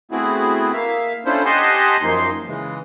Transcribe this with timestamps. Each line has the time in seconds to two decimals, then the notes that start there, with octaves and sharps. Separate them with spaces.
0.11 A3 B3 C4 E4 F#4 G#4
0.73 A#3 E5 F5
1.25 C#4 D4 E4 F4 A4 C5
1.45 G4 D#5 F#5 G#5 A5 C6
2.02 F#2 F3 A#3 D#4 C6
2.47 C#3 E3 G#3